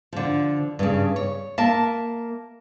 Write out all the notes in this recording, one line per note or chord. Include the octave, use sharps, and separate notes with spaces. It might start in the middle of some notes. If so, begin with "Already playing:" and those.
D3 F3
G2 C#3
C#5
A#3 E5 A5